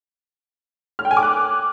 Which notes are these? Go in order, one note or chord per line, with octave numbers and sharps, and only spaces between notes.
F6
G5
G#5
D6
F#6